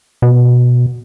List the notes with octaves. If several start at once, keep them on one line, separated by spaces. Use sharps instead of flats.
B2